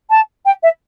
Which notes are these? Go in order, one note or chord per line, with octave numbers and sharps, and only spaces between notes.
A5
G5
E5